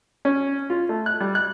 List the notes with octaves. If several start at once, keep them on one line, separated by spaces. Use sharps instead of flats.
C#4
F4
A3
F#6
G3
F#6